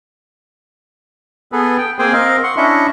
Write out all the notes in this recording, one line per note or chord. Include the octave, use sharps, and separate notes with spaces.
B3 G#4 A4 B4
G5
A#3 C4 G#4 C5 G5 G#5
C4 A#4 D#5 F5
F#5 C6 C#6
C#4 D4 E4 D#5 E5 C#6